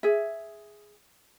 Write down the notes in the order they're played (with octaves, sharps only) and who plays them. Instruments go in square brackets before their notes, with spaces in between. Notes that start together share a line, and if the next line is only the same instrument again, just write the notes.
[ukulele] G#4 E5